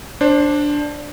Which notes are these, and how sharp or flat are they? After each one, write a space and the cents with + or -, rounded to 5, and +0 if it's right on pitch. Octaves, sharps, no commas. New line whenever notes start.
D4 +0 C5 +20